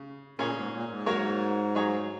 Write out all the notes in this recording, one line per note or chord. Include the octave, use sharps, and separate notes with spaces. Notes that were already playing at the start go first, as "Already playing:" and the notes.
Already playing: C#3
A#2 A#3 C#4 G#4 C#5
G#2
A#2
G#2
F#3 A#3 F#4 A#4 C#5
F#3 D#4 G#4 C#5